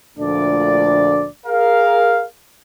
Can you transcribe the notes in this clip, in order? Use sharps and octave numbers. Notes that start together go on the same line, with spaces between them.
D2 A#2 F3 A3 D4 D5
G#4 A#4 F5